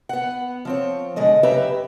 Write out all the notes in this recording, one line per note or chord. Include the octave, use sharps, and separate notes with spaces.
B3 F#5
F3 C4 C#5
B2 D3 G#3 A4 D#5
F#2 C#3 G4 B4 E5 A#5